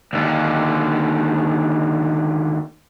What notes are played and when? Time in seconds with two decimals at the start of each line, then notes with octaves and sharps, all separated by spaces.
0.13 D#2 D3